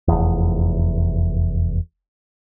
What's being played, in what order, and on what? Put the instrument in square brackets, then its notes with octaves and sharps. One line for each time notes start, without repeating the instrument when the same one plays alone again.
[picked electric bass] F1 E2